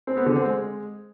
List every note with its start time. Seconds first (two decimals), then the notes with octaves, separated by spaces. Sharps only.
0.07 C4
0.17 B3
0.26 D3
0.36 C4
0.45 G#3